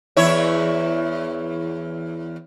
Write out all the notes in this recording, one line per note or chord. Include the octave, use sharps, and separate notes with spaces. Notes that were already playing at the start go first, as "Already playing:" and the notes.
E2 E4 C#5